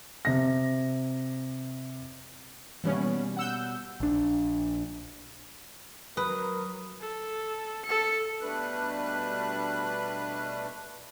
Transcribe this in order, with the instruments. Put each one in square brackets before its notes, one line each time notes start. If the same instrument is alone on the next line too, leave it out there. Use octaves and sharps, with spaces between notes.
[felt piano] C3 A#6
[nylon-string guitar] B2 G3 A#3 [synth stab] E3 B3 C#4
[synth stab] F#5 E6 G6
[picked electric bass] A#1 D4
[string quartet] F#3 [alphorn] A#4 [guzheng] B4 [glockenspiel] D#6
[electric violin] A4
A4 C#7
[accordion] B2 G3 A3 D4 B4 F#6